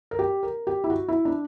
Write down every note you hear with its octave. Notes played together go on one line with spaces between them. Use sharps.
A#4
G4
A#4
G4
E4
F#4
E4
D4